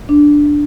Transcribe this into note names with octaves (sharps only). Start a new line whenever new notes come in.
D4